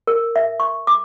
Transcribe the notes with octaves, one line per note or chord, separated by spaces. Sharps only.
A#4
E5
C#6
D6